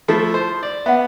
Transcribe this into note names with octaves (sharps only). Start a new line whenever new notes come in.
F3 A3 E4
C5
D5
B3 E5 F#5